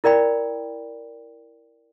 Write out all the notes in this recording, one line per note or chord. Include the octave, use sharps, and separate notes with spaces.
E4 A#4 D5 G5 B5